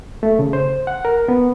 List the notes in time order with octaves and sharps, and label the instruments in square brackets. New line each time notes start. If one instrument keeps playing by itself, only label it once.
[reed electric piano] A3
C#3
C5
F#5
A#4
B3